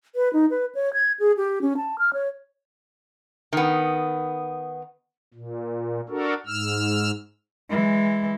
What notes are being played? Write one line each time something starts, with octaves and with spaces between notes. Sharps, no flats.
B4
D#4
B4
C#5
G#6
G#4
G4
C#4
A5
F6
C#5
D#3 B3
A#2
D4 F#4 A4 A#4
G#2 E6 F6
E3 G#3